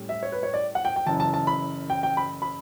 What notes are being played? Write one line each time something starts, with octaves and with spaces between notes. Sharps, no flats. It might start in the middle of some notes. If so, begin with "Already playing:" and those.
Already playing: A2 G3 C#4
E5
C#5
B4
C#5
D5
F#5
G5
G5
F#1 F#2 E3 A5
A5
A5
B5
G5
G5
B5
B5